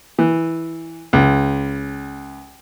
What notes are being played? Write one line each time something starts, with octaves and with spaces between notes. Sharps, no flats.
E3
C#2